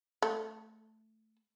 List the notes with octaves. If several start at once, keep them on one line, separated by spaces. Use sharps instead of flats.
A3